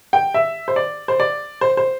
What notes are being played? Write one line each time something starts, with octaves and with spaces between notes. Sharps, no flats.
G5
E5
C5
D5
C5
D5
C5
C5